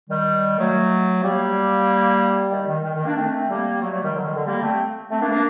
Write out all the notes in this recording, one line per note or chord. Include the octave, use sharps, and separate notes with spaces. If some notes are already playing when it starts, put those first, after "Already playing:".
D#3 G3
F#3 A3
G3 A#3
D#3 G3
D#3
D#3
D#3
A#3 D4
A3 C4
G3 A#3
F#3 A3
F#3 A3
D#3 G3
D3 F#3
D#3
D3
G3 A#3
A3 C4
A3 C4
A#3 D4
A#3 D4